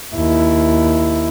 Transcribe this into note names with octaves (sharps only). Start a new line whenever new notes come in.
D#2 E4